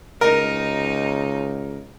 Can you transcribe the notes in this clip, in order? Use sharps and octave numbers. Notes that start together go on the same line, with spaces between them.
C#2 D#4 A#4